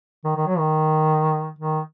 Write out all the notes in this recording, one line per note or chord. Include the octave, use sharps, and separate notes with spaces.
D#3
D#3
F#3
D#3
D#3